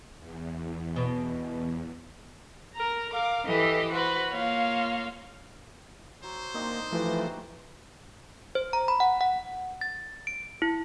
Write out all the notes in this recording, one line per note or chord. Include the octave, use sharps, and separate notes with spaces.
E2
B2
A#4 A#5
A#4 F5 D6
E3 G4 A4 D#5
F#4 B4 C5
A#3 F4 C#5 F5
F#3 C5
A#3 C4 D4 D#4
E3 F3 A3 F#4 G4 G5
C5
A#5
B5
F#5
F#5
A6
D7
E4